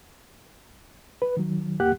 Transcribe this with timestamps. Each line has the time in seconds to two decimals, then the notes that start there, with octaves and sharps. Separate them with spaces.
1.22 B4
1.37 D#3 F#3
1.80 D#2 A#3 G4 F#5 F#6